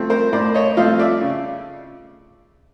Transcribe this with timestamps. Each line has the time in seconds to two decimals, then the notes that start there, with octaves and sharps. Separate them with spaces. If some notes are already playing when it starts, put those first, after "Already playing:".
Already playing: F3 A3 C4
0.10 A#4 C5
0.33 A2 C5 D5
0.54 C#5 D#5
0.77 F3 A3 C4 D#5 F5
0.99 D5 E5
1.21 C#3